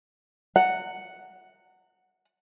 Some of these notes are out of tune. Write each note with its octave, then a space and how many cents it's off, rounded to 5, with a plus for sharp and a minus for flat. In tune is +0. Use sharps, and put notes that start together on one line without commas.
F#5 +0 A#5 -35